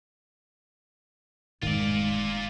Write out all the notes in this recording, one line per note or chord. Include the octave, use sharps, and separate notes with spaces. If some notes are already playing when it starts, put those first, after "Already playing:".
F1 G#2 D#3 G#3 F4 D5